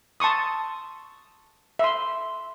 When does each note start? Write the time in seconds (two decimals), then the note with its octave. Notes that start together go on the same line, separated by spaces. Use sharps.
0.20 A5 C6 C#6 D#6
1.79 E5 C6